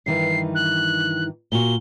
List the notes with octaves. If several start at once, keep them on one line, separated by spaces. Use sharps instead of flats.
G2 D#3 E3 C7
F#6
A#2 F#4 G7